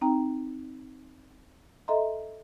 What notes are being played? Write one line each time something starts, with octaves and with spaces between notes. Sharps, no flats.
C4 D#4 G5 A#5
A4 D#5 E5 A#5 C6